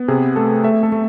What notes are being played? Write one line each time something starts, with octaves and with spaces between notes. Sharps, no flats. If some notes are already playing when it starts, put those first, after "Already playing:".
Already playing: B3
C3 G#4
A3 A4
A3 E5
A4
A3